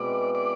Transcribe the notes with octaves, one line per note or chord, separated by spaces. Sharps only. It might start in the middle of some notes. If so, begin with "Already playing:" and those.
Already playing: B2 G#3 C4 E4 D5
D5